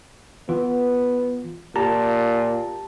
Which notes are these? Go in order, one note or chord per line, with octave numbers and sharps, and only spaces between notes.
E3 B3 F4
A#2 G4 A5 A#5